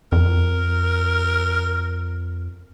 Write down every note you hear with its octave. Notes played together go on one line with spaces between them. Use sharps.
F2 A#4